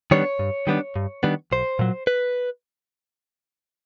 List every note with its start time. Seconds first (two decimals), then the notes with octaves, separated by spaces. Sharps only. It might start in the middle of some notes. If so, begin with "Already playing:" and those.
0.11 D#3 G3 B3 D4 C#5
0.39 G2
0.67 D#3 G3 B3 D4
0.96 G2
1.23 D#3 G3 B3 D4
1.52 B1 C5
1.79 A#2 F#3
2.07 B4